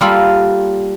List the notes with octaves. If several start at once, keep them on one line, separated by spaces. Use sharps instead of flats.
G3 A#3 F4 A4 B5